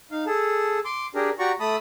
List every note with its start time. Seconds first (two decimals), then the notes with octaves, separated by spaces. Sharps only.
0.11 D#4 F5
0.27 G#4 A4 A5
0.85 C6 D6
1.15 D4 G4 G#4 A#4
1.39 F#4 G4 D5 A#5 C#6
1.60 A3 A5 B5 D#6